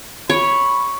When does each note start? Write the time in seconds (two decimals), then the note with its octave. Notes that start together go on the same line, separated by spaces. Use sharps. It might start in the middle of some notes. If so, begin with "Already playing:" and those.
0.30 C#5 B5